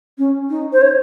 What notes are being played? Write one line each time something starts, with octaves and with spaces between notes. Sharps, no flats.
C#4
D#4
C5
C#5